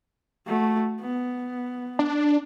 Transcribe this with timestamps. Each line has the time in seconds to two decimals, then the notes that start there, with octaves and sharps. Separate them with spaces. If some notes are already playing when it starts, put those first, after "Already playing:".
0.46 A3 F#4
1.00 B3
1.99 D4